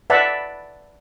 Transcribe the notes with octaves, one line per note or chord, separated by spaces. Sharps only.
B4 D5 E5 F#5 A5 B5